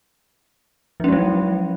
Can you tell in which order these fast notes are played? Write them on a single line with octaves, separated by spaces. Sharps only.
F3 C#4 G#3 F#3